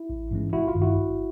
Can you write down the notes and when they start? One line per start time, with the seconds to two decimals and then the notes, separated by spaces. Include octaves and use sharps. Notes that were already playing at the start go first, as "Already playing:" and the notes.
Already playing: E4
0.10 A1
0.31 G#2 E3 G#3 C#4
0.53 G#1 E4 F#4
0.68 F4
0.75 G2 D#3
0.82 E4 F#4
0.97 G#1